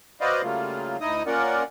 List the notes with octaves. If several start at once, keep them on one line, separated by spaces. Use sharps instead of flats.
F#4 B4 C5 D5 D#5 F5
C#3 F#3 G3 A3 A#3 F4
D2 D#4 E4 D#5 D#6
A#3 C#4 F4 A#4 D5 F#5